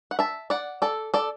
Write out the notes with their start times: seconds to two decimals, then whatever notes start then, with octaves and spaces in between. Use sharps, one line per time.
0.11 F#5
0.19 E5 A5
0.50 D5 F#5
0.82 A4 D5
1.14 A4 D5